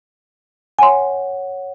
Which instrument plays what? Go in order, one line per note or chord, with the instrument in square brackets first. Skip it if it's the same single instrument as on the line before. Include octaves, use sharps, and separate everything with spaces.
[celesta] C#5 F#5 [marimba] G#5 C6